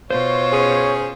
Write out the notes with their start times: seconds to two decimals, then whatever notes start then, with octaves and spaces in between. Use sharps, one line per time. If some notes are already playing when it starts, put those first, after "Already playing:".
0.10 B2 F4 C5 C#5
0.53 C#4 G#4